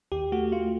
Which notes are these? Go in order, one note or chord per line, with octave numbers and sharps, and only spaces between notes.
D#2 G4
A3 F#4
A3 F4